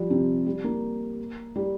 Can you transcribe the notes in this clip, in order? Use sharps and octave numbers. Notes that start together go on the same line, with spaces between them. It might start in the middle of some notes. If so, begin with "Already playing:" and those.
Already playing: F3 G3
C3
G3
A#3
G3